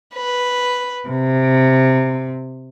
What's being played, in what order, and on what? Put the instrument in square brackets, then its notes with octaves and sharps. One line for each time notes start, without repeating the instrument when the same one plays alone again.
[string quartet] B4
C3